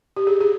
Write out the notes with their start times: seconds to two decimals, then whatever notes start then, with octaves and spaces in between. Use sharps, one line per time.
0.16 G4
0.27 G#4
0.41 G#4